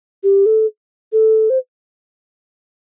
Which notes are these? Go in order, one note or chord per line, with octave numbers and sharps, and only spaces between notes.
G4
A4
A4
C5